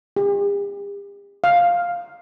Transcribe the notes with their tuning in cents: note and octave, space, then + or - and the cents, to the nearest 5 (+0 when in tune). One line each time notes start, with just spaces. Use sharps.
G4 +45
F5 +5